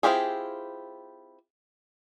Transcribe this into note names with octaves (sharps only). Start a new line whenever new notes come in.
C4 E4 F4 G4 G#4